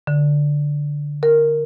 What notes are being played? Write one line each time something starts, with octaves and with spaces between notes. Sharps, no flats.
D3
A#4